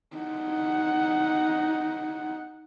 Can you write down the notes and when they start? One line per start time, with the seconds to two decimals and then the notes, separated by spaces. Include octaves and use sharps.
0.17 D#4 F#5